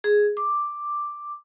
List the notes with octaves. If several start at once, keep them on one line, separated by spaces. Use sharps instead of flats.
G#4
D6